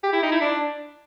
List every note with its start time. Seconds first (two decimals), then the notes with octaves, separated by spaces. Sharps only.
0.03 G4
0.13 E4
0.22 D#4
0.32 E4
0.41 D4